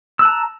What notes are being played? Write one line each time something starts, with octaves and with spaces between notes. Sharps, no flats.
A5 A#5 E6 F#6